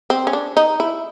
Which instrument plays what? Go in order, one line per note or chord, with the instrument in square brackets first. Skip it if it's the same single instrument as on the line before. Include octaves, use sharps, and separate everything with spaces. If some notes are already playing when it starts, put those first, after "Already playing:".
[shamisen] C4
C#4
D4
D#4
E4